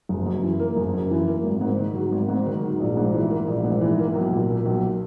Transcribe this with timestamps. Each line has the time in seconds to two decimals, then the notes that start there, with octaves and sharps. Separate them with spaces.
0.09 F#1
0.26 F#2
0.43 E3
0.60 A#3
0.76 F#1
0.94 F#2
1.11 E3
1.27 A#3
1.44 G#1
1.61 G#2
1.78 D#3
1.95 F#3
2.12 G#1
2.29 G#2
2.46 D#3
2.63 F#3
2.80 A#1
2.97 G#2
3.14 E3
3.30 A#3
3.47 A#1
3.64 G#2
3.81 E3
3.99 A#3
4.15 B1
4.32 A#2
4.49 A#3
4.65 B1